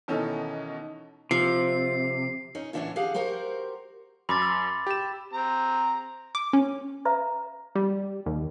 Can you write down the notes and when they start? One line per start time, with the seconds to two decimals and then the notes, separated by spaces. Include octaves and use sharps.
0.08 B2 D#3 E3 C#4 D#4 A4
1.31 C3 F3 C7
2.55 C#4 D#4
2.73 A2 D3 E3 C#4 D4 C#5
2.96 G4 G#4 F5 F#5
3.14 F#4 G4 A#4 C5
4.29 F#2 B5 D6 A6
4.42 E6
4.87 G4 E7
5.33 C4 A#5
6.35 D6
6.53 C#4
7.05 B4 E5 A#5
7.75 G3
8.26 D#2